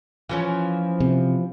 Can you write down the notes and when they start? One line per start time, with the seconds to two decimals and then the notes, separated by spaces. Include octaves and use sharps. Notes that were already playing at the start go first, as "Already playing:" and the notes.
0.29 E3 F3 C#4
1.00 C3